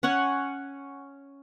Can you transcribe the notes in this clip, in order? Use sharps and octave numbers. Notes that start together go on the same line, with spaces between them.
C#4 C#5 F#5 G#5